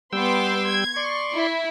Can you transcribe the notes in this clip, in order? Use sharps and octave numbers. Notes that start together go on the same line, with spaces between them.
G3 B3 G5 C6 D6 E6
G#6
D5 C6 C#6
E4